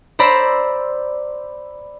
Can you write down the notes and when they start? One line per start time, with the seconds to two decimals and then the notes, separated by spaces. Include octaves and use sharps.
0.19 C5 D5 A#5 B5 E6